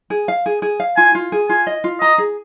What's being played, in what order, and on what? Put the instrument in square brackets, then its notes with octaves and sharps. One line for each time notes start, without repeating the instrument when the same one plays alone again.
[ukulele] G#4
F5
G#4
G#4
F5
[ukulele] F4 [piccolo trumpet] G#5
[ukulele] F4
G#4
[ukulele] F4 [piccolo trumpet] G#5
[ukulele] D#5
F4
[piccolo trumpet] D#5 [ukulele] A#5
[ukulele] G#4